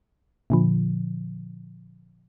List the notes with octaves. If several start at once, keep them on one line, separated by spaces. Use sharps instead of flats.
A#2 D3 F3